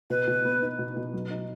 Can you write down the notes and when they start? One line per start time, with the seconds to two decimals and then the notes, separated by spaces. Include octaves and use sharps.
0.10 B2 B4
0.28 B2
0.45 B3
0.62 D#4
0.79 B2
0.97 B2
1.14 F#3
1.30 D#4